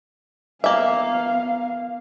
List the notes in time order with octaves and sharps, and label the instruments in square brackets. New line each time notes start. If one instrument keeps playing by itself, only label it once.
[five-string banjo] A#3 E5 [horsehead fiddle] B3 F5